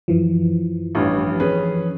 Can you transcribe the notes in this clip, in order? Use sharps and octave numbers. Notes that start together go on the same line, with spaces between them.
F#2 E3 F3
A1 G2
C#4 G#4 B4